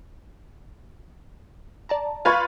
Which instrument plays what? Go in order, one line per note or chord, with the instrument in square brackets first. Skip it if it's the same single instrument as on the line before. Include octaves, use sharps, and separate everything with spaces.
[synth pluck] D5 A5 A#5
[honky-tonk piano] F4 B4 C#6 [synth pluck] F5 G#6 A6